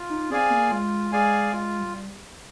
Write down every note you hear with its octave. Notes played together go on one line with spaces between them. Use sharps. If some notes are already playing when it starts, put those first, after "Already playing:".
Already playing: F4
D#4
C4 G#4 D5 F5 G#5
A#3
G#3 F4
G#3 G#4 D5 F5 G#5
G#3 F4
G3